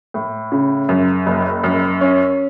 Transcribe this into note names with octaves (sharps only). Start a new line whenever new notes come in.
A2
C#3
F#2
F#1
F#2
C#4